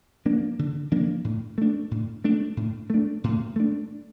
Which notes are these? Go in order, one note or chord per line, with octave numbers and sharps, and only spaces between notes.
F3 A#3 D4
D3
F3 A#3 D4
A2
A3 D4
A2
A3 D4
A2
A3 D4
A2
A3 D4